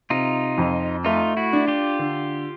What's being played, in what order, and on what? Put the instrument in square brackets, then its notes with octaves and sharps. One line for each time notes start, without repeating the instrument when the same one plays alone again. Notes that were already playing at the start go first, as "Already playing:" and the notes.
[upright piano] C3 [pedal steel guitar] D#4 F4
[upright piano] F2
[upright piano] A3 [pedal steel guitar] D#4 F4
[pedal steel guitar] E4 F#4
[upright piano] D4
[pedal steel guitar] F4 G4
[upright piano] D3